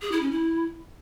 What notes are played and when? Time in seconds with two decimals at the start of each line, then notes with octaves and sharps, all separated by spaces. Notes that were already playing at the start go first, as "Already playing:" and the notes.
0.02 G#4
0.12 E4
0.21 C#4
0.31 E4